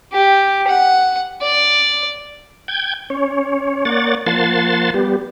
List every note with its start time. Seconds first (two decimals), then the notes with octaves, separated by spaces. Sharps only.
0.13 G4
0.67 F#5
1.42 D5
2.68 G5 G6 G#6
3.10 C#4 C#5
3.85 A#3 C#5 D5 F#5 A6
4.26 F3 A#3 F#5 A5 C6 A6
4.94 G3 B3 G4